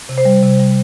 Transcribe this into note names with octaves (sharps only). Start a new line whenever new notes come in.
C3
C5
G3
C3
G3